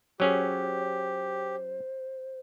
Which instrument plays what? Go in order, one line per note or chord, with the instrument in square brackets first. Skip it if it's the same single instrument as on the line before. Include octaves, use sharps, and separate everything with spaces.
[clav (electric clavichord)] F#3 C#4 G#4 [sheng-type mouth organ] G4 [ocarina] C5